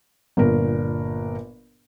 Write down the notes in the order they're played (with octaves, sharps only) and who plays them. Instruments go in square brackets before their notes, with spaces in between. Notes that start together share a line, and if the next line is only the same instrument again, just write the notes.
[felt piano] G1 A#2 A#4